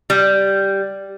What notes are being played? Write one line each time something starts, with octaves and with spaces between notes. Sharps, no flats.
G3